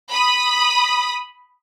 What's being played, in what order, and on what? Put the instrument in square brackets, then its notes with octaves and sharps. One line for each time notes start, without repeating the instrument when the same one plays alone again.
[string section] B5 D#6